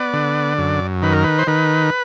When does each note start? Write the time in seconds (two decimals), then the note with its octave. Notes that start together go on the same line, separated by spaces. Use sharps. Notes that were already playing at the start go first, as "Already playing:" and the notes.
Already playing: B3 D5
0.13 D3
0.58 F#2
1.02 D#3 B4
1.13 A#4
1.24 B4
1.39 C5
1.47 D#3 B4